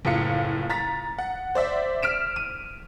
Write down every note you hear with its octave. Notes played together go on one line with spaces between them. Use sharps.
F#1 A2 F4 C#7
A#5 A6 B6
F#5
C5 D5 E5
F6 B6 D7 E7
D#7